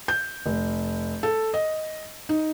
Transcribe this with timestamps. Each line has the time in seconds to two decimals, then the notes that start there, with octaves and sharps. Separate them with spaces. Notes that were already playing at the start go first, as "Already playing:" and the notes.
0.08 G6
0.46 F1
1.23 A4
1.54 D#5
2.29 D#4